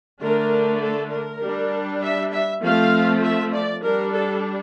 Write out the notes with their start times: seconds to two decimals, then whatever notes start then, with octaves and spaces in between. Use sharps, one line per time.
0.21 D3 A3 D4 A#4
0.81 A4
1.11 A#4
1.41 G3 D4
2.01 E5
2.31 E5
2.62 F3 A3 C4 F5
3.23 E5
3.53 D5
3.83 G3 D4 A#4
4.13 A4